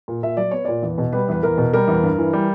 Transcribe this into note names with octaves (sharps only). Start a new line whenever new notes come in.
A#2
A#2 E5
F#3 D5
B3 C#5
A#2 D5
E2
B2
G3 B4
E2 B4
E2 A#4
B2
G3 A#4
E2
G2
E3
G3